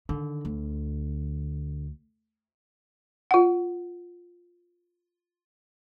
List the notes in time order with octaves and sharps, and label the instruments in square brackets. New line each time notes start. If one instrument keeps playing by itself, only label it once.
[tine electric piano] D3 [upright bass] D#3
[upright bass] D2
[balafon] F4 F#5